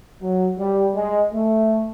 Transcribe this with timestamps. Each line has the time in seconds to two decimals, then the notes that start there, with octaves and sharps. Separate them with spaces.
0.22 F#3
0.59 G3
0.95 G#3
1.32 A3